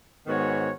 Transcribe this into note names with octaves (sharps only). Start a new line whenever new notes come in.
G#2 D#3 B3 F#4 C#5